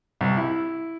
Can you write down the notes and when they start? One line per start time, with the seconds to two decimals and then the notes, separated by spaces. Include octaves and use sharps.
0.21 C2
0.37 E4